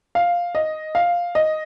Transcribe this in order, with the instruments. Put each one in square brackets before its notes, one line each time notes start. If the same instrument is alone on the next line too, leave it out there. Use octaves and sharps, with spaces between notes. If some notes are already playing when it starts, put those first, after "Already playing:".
[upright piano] F5
D#5
F5
D#5